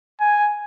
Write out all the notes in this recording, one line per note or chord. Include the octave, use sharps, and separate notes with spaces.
G#5